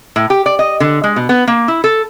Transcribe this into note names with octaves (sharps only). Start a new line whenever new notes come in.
A2
G4
D5
D#5
D3
G#3
B2
B3
A#3
E4
A4